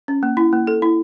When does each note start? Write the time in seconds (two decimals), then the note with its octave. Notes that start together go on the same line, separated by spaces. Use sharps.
0.08 C#4
0.23 A#3
0.37 E4
0.53 A#3
0.67 A4
0.82 E4